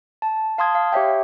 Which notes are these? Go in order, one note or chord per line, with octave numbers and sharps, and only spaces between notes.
A5
F5 A5 C6 D#6 G#6
F5
G4 C#5 E5 G5